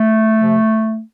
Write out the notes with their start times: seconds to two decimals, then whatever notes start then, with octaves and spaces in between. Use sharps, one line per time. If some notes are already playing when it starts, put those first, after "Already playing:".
Already playing: A3
0.39 C3 F3